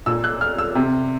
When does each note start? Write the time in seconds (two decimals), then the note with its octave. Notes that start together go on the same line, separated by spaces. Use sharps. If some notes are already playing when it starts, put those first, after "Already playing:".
0.06 A#2 E6
0.24 F#6
0.41 F6
0.58 E6
0.75 C3